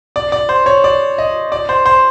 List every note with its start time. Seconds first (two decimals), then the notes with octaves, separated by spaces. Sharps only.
0.16 D5
0.32 D5
0.49 C5
0.66 C#5
0.84 D5
1.18 D#5
1.52 D5
1.69 C5
1.86 C5